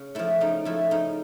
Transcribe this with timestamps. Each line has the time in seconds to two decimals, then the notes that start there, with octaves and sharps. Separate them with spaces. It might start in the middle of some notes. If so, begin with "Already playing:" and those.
Already playing: C#3
0.15 F3 A3 E4
0.41 C#3 D#4
0.65 F3 A3 E4
0.91 C#3 D#4